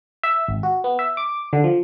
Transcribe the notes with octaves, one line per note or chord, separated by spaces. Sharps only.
E5
G#1
F#4
B3
E5
D6
D3
F3